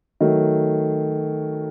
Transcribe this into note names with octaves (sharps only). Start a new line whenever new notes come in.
D#3 F#3 A3